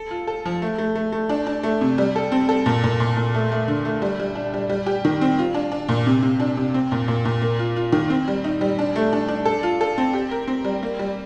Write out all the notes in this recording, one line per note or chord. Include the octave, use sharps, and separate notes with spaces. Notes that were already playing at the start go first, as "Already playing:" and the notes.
Already playing: A4
F4
A4
F3
A3
A3
A3
A3
D4
D4
A3
C3
G3
A4
C4
A4
A#2
A#2
A#2
A#2
A3
A3
D3
A3
G3
G3
D4
G3
G3
G4
D#3
C4
F4
D4
D4
A#2
C3
C3
D4
C3
C4
A#2
A#2
A#2
A#3
F4
F4
D#3
C4
G3
D#4
G3
D4
A3
D4
D4
A4
F4
A4
C4
G4
A#4
C4
G3
A#3
G3